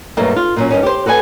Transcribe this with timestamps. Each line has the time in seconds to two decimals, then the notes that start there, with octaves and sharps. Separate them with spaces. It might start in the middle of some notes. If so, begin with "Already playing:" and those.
0.17 G2 B2 F#3 G3 A3 A#3
0.36 F4
0.56 A#2 F#3 C#4
0.70 G2 D#3 C#4
0.83 G4 C5
1.06 F#4 A4 B4 D5 G#5